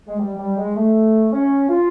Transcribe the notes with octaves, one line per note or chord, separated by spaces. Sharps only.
G#3
G3
G3
G#3
A3
C#4
F4